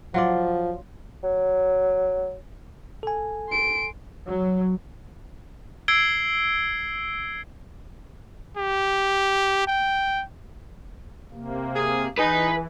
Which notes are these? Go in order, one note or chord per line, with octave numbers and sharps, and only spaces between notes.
F3 F#3 F4 D5
F#3
A4 G#5
C6 D7
F#3
E6 G#6 C7 D7 G7
G4
G5
C3 A#3
G#4
E3 D#4 G#4 B4